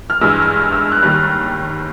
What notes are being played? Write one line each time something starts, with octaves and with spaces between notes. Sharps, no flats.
F6
G2 E3 G#3 E6
F6
F6
E6
F6
F#6
D#2 D#3 G3 F6